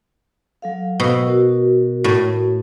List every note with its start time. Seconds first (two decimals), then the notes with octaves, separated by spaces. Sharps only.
0.62 F#3 A4 F5
1.00 B2 E6
1.27 F#4 A#4
2.04 A2